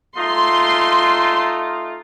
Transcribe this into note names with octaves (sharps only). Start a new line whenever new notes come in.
A3 D#4 F4 C6